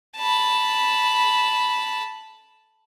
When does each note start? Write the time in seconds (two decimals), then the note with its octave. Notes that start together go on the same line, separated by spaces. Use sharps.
0.18 A5 B5